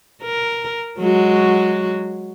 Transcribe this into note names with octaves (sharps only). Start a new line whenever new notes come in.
A#4
F#3 G#3 F#4